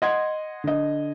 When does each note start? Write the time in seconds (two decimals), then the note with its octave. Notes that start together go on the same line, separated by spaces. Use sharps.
0.02 D#5 F#5 C6 G#6
0.64 D3 D#5